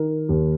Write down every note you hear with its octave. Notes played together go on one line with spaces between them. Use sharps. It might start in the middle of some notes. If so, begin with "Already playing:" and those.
Already playing: D#3 A#4
D#2